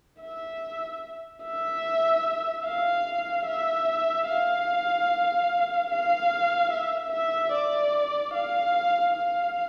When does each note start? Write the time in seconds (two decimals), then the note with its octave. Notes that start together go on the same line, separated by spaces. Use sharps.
0.22 E5
1.43 E5
2.66 F5
3.46 E5
4.27 F5
5.91 F5
6.72 E5
7.12 E5
7.52 D5
8.34 F5
9.16 F5